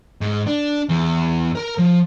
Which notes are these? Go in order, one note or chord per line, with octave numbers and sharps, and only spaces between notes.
G#2
D4
E2
A#4 A#5
F3